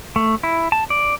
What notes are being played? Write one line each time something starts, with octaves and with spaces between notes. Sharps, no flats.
A3
E4
A5
D5